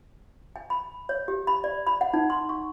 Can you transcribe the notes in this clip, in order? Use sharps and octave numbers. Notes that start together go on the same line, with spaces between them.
G#5
B5
C#5
G4
B5
D5
B5
F#5
D#4
C6
C#6